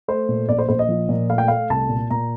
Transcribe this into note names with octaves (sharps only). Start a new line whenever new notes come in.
A3 C5
A#2
A#1 D5
C5
A#1 C5
D#5
F3
A#2
A3 F5
G5
A3 F5
C2 A5
A#2
A#2 A#5